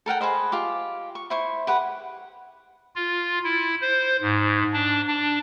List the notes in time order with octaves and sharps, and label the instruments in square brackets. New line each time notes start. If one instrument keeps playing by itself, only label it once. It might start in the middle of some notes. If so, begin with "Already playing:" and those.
[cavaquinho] A4 A#4 F#5 G5
G#4 B4 C5 D#5
F4 G4 D6
C#6
E4 C5 C#6
G4 B4 F#5
[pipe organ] F4
E4
C5
G#2
D4
D4